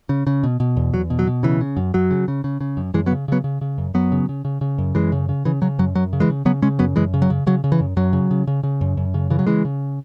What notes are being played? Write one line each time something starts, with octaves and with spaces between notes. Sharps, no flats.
C#3
C#3
B2
B2
E2
E2 F#3
B2
F#3
B2
C#3 E3
C#3
F#2
F#2 F#3
C#3
C#3
C#3
C#3
F#2
F#2 E3 G#3
F#3 B3
C#3
C#3 F#3 B3
C#3
C#3
F#2
F#2 F#3 B3
C#3
C#3
C#3
C#3
F#2
F#2 E3 G#3
C#3
C#3
C#3 E3
C#3 F#3
F#2 F#3
F#2 F#3
C#3
E3 G#3
C#3
C#3 F#3 B3
C#3 G#3 C#4
F#2 F#3 B3
F#2 E3 G#3
C#3
F#3
C#3
C#3 F#3
C#3
E3
F#2
F#2 F#3
C#3
C#3
C#3
C#3
F#2
F#2
C#3
C#3 E3
F#3
C#3 E3 G#3
C#3